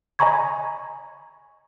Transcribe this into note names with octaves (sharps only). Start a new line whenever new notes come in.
D#5 G#5 A#5 B5 C#6 G#6